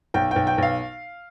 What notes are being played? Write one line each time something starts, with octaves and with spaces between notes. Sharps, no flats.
B1 G5
B1 G5
G5
B1 F5